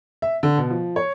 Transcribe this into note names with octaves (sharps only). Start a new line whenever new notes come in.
E5
D3
B2
F3
C#5